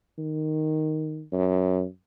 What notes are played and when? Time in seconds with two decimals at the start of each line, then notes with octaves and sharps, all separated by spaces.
0.18 D#3
1.33 F#2